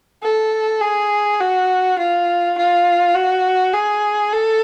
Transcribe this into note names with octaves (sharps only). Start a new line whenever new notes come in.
A4
G#4
F#4
F4
F4
F#4
G#4
A4